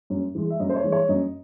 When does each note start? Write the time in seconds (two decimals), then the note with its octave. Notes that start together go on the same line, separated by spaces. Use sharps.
0.10 F#2
0.35 E3 G#3
0.50 E5
0.59 F#2 D#5
0.69 C5
0.76 C#5
0.84 E3 G#3
0.92 C#5
1.09 F#2 D#5